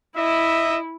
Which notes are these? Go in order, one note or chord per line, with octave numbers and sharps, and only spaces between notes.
E4 D#5 E5